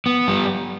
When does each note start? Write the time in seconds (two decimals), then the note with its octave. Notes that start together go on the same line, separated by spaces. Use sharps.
0.06 B3
0.28 G3